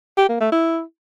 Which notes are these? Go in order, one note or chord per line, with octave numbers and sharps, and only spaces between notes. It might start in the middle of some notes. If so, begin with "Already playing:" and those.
G4
A#3
A3
E4